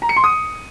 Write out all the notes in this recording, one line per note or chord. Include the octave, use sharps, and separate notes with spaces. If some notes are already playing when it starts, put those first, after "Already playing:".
A#5
C#7
C6
D#6